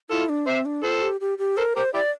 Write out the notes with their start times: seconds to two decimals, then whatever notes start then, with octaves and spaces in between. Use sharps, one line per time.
0.10 E4 F4 A4
0.29 D4
0.47 C4 C5 E5
0.65 D4
0.83 F4 A4 C5
1.02 G4
1.21 G4
1.38 G4
1.57 A4 A#4 C5
1.76 G4 A#4 C5
1.94 E4 G4 D5